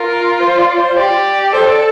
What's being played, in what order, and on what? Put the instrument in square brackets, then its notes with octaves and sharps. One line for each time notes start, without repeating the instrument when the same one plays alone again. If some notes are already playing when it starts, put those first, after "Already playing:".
Already playing: [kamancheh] F4 [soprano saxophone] A#4
[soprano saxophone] C5
D5
C5
[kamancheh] G4 [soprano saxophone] D5
[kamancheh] A4 [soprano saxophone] C5
[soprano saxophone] D5